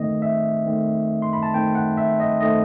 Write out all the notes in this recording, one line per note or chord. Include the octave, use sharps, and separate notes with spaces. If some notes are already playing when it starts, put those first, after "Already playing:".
Already playing: D#3 A3 C4 D#5
E5
D#3 A3 C4
C6
B5
A5
D#3 A3 C4 G5
F#5
E5
D#5
D#3 A3 C4 D#5